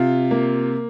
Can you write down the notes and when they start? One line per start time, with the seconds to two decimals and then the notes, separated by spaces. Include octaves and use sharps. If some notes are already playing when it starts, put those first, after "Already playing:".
Already playing: C3 F4
0.31 A#3